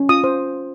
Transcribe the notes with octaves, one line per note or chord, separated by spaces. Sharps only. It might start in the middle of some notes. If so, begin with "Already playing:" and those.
Already playing: C#4
F4 D#6
C5